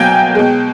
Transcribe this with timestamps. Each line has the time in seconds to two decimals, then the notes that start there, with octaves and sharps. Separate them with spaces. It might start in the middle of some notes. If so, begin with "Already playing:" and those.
Already playing: B2 F#3 A#3 G5 G#5
0.35 B2 G#3